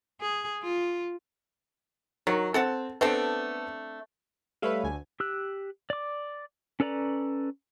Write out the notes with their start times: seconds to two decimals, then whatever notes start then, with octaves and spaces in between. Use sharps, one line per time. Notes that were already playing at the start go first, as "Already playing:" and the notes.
0.21 G#4
0.63 F4
2.27 D#3 F#3
2.54 C4 A4 F#5 A5
3.01 A3 B3 C4 D4 A4
4.62 G3 A3 B4 C#5 E5 F5
4.84 D2 G#5
5.20 G4 E6 F#6
5.90 D5 D6
6.80 C#4 A4 B4 D5 A#5